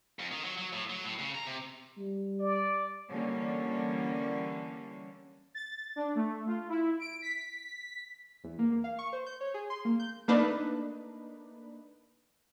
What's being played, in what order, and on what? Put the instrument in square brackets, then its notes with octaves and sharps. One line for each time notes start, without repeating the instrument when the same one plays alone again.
[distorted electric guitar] F2
D#3
F#3
F#3
A2
F#3
A2
C#3
A#5
C3
[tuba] G3
[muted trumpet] D5
[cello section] D3 E3 G3 A#3 C#4
[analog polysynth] A6
D4
A3
F4
E4
D7
B6
[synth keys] E2
A#3
A#3
F5
C#6
C5
G6
C#5
G#4
C6
A#3
G6
[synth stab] A3 A#3 D4 D#4 B4